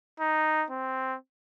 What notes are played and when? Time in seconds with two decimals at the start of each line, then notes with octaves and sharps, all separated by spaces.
0.20 D#4
0.71 C4